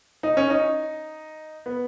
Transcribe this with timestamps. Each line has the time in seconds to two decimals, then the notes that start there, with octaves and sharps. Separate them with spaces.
0.23 D#4
0.37 C#4
0.50 D#4
1.66 B3